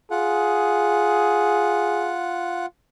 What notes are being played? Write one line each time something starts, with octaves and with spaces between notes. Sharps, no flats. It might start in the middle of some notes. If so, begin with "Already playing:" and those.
F4 G#4 F#5